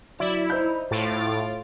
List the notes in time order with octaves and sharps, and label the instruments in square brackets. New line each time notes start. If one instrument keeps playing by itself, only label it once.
[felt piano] F#3 [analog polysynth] E4 [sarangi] D5
[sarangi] D#4 [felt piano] C5 G6
[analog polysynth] A2 A6 D7 [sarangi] F4